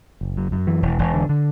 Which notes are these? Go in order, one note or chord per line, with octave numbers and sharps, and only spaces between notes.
F#1
F#2
F#2
E3
E1
E1
D3
D3